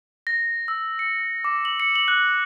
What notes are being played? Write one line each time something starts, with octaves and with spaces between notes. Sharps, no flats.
A#6
E6
C#7
D6
F#7
C#7
F#7
F#6